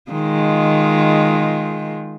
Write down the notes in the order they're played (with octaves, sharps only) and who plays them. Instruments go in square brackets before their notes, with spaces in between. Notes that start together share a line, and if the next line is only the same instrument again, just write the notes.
[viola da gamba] D#3 G#3 F4